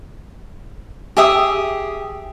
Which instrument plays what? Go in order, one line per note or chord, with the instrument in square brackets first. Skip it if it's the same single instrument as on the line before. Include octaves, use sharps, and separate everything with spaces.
[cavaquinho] G4 G#4 E5 D#6